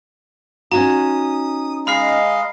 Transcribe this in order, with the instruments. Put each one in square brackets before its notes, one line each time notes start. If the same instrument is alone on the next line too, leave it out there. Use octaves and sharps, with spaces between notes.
[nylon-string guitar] C#4 D#4 F#4 [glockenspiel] A#5 [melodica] D#6
[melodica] G#3 D#5 F5 [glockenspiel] B5 F6 C7